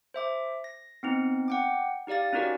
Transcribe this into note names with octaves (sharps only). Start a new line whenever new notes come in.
C5 E5 D6
A#6
B3 C4 D#4
F#5 G5 D6
D#4 G4 D5 F5 A6
C#4 D#4 F4 F#4 A#4 D5